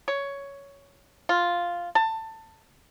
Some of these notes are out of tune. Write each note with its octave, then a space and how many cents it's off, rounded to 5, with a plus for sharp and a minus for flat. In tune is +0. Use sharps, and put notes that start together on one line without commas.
C#5 +10
F4 +0
A5 +20